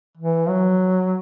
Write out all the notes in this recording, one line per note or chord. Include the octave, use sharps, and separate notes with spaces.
E3
F#3